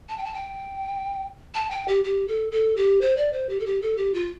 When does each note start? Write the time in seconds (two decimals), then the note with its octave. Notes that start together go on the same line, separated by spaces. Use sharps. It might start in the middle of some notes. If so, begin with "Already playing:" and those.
0.09 A5
0.18 G5
0.25 A5
0.34 G5
1.55 A5
1.71 G5
1.88 G4
2.04 G4
2.28 A4
2.52 A4
2.76 G4
3.01 C5
3.17 D5
3.33 C5
3.49 G4
3.60 A4
3.66 G4
3.82 A4
3.97 G4
4.14 F4